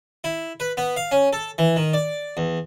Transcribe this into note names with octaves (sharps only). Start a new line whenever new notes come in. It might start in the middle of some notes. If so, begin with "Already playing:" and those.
E4
B4
B3
F5
C#4
A4
E3
D#3
D5
E2